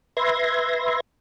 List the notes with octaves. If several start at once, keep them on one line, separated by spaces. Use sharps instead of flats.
B4 E5 C6 G#6 A#6